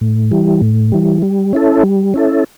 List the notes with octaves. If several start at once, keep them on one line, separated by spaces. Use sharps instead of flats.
A2
E3 G3
A2
E3 G3
G3
C#4 E4 A4
G3
C#4 E4 A4